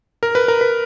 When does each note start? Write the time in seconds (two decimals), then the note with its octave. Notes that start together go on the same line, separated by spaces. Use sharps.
0.23 A#4
0.35 B4
0.48 A#4
0.61 B4